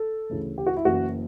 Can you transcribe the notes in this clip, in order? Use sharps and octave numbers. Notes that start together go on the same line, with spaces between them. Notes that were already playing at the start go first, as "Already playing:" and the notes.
Already playing: A4
D2 C#3 E3
G4
F#4
E4
F#1 F#2 E3 F#4